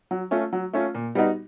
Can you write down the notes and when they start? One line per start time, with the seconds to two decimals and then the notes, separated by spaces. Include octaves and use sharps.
0.11 F#3
0.31 A3 C#4 F4
0.53 F#3
0.73 A3 C#4 F4
0.95 A#2
1.15 G3 B3 D#4 F#4